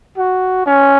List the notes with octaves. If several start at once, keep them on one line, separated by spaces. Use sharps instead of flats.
F#4
C#4